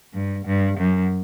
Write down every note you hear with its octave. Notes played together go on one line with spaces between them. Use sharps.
G2
G2
F#2